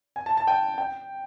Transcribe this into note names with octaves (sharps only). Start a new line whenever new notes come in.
G#5
A5
A5
G5
G5